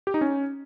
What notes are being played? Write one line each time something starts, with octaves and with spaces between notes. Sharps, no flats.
G4
D#4
C#4